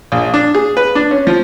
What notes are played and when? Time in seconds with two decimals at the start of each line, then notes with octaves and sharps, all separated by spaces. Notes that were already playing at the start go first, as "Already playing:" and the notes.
0.12 A#1
0.34 D4
0.55 G#4
0.77 B4
0.95 D4
1.11 C#4
1.27 F3